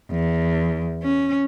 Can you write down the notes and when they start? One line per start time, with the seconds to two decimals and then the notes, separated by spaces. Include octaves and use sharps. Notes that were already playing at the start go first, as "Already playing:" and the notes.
0.11 E2
1.03 C#4